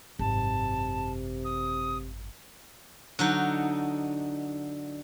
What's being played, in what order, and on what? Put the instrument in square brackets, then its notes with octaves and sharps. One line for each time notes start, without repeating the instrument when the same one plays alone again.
[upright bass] G#1 F#2 [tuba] C3 [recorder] A5
[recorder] D#6
[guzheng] D3 F#3 D#4